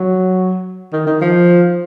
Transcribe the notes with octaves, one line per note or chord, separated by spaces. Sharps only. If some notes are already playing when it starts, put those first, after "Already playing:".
Already playing: F#3
D#3
D#3
F3